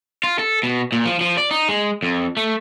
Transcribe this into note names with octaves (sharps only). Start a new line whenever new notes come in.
F4
A4
B2
A#2
F3
F3
D5
D#4
G#3
F2
A3